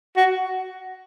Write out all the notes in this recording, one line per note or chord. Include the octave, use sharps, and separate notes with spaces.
F#4